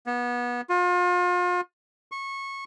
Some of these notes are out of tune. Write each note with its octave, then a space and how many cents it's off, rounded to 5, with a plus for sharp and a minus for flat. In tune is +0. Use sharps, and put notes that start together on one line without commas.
B3 -25
F4 +35
C#6 -20